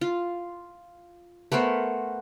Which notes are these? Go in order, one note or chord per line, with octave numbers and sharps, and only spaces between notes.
F4
A3 B3 A#4 C5